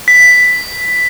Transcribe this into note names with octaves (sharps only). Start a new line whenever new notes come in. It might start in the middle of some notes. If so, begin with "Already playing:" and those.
B6